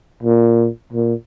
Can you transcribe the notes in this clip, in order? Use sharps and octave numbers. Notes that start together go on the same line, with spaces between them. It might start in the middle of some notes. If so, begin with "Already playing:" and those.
A#2
A#2